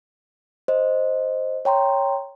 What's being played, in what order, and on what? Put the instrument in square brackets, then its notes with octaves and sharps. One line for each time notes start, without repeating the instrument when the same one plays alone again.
[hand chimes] C5 D#5
C#5 G5 A#5 C6